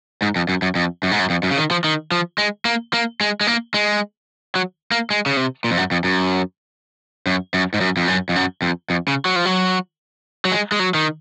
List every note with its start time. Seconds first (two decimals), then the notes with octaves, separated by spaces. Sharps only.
0.22 G#2
0.36 F2
0.49 F#2
0.62 F#2
0.75 F2
1.03 F#2
1.11 G#2
1.19 F#2
1.30 F2
1.43 F#2
1.51 C#3
1.58 D#3
1.71 F3
1.84 D#3
2.11 F3
2.38 G#3
2.65 A#3
2.93 A#3
3.21 G#3
3.41 G#3
3.47 A#3
3.74 G#3
4.55 F#3
4.91 A#3
5.10 G#3
5.26 C#3
5.37 C3
5.64 A#2
5.71 F2
5.77 F#2
5.91 F2
6.04 F#2
7.27 F#2
7.54 F#2
7.74 G#2
7.81 F#2
7.97 F2
8.08 F#2
8.29 F2
8.36 F#2
8.62 F2
8.90 F2
9.08 C#3
9.25 F#3
9.36 F3
9.45 F#3
10.45 F#3
10.52 G#3
10.72 G#3
10.79 F#3
10.94 D#3